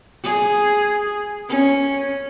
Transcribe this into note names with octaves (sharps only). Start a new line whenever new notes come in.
G#4
C#4